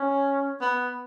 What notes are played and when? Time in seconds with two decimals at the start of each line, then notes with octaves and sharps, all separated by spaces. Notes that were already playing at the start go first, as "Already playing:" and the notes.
Already playing: C#4
0.61 B3